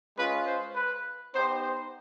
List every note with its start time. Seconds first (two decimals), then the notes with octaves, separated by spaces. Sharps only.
0.17 G#3 C#4 F4 B4
0.46 C5
0.76 B4
1.33 B3 D#4 G4 C5
1.62 C5